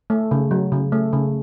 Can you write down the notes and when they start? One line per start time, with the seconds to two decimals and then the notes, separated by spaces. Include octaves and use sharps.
0.10 A3
0.31 C#3
0.51 F#3
0.72 C#3
0.92 A3
1.13 C#3